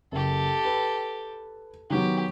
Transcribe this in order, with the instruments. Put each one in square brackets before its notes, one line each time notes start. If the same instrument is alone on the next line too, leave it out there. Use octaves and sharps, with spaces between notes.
[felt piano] F#1 [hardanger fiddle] G4 A4
[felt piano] B4
[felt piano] D#3 F#3 B3 [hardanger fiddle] G4